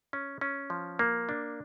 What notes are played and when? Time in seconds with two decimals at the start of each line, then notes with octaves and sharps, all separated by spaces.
0.13 C#4
0.41 C#4
0.70 F3
0.99 A#3
1.29 D4